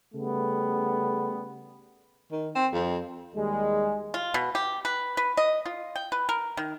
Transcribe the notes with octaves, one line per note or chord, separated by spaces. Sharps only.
C#3 G3 A3 B3
D#3
C4
F2
D#2 G3 G#3
F4
B2
G4
B4
B4
D#5
F4
G5
B4
A#4
D#3